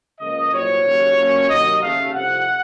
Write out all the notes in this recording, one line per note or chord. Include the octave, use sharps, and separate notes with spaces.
C#2 C#3 F3 A#3 D#5
C2 A#2 F#3 C4 C#5
D#2 C#3 F#3
A#2 F#3 A#3 C#4
C3 D#3 F#3 A#3 D#5
D#2 C#3 A3 F5
C2 C3 F3 A3 F#5